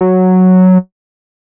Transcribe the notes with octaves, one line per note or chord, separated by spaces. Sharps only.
F#3